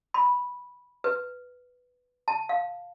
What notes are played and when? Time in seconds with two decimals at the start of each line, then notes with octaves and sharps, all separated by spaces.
0.14 B5
1.04 B4
2.28 A5
2.49 F5